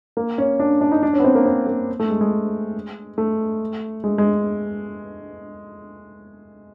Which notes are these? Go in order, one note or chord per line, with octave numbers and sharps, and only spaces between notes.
A#3
C#4
D4
D4
D#4
D4
C#4
B3
C4
A#3
C4
A#3
A3
G#3
G#3
A3
G#3
G#3